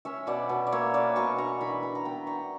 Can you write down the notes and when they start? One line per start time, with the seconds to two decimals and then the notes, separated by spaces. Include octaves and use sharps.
0.05 C#4 C#5 E5
0.27 B2 D5 F#5
0.49 B2
0.67 D5
0.72 A#3 C#5 E5
0.94 C#4 B4 D5
1.16 B2 A#5 C#6
1.38 D4 A#5 C#6
1.61 E3 B5 D6
1.83 E3 A#5 C#6
1.95 A#5
2.05 B3 G5 B5
2.27 D4 A#5 C#6